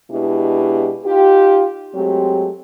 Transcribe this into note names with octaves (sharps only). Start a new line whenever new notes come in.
B2 G#3 D4 E4 G4
D#4 F4 G4
F#3 G#3 A3 C4 G4